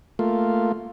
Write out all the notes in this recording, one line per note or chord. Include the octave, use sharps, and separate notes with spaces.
A3 A#3 F4